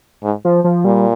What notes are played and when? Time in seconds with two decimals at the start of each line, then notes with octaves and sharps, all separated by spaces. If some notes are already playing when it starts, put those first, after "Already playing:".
0.24 G#2
0.45 F3
0.64 F3
0.85 A#2 G3